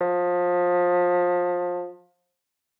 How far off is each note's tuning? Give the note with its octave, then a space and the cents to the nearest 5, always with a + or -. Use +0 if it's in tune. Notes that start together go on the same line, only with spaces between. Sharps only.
F3 +25